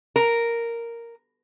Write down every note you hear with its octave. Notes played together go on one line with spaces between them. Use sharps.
A#4